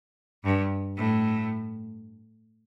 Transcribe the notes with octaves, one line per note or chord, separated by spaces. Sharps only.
G2
A2